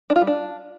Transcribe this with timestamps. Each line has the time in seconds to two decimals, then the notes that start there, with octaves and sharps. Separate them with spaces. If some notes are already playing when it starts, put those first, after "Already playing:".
0.10 D4
0.16 F4
0.21 G3
0.27 D4